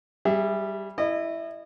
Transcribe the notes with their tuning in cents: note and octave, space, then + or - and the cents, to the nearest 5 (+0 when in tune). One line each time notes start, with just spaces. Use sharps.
G3 +0 G#4 -30 E5 +0
E4 +0 D#5 -30